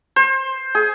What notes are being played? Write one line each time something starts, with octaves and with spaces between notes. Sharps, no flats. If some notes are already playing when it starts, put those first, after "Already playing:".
C5
G#4